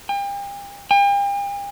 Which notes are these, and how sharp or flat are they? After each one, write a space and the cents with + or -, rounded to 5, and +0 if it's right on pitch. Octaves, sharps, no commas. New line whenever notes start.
G5 +40
G5 +45